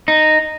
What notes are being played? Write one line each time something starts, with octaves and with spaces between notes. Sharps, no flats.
D#4